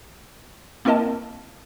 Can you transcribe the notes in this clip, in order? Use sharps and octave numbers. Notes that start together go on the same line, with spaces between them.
A#3 C4 E4 A#4 D#5 A5